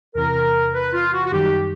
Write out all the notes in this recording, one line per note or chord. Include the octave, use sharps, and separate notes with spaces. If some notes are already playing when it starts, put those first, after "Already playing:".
E2 C3 E3 A#4
B4
F4
F#4
F#4
F#2 D#3 G3 G4